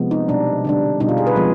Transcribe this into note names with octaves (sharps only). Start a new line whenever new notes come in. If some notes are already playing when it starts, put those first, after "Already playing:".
Already playing: C3 F3 G#3 B3
D#4
B2 G3 D4
D3 G3 D4
B2 G3 D4 D#4
F4
G#4
B4
F3 G#3 C4